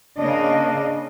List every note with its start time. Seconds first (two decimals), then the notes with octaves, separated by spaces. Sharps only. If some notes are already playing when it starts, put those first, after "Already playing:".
0.18 C#3 A#3 D4 D#5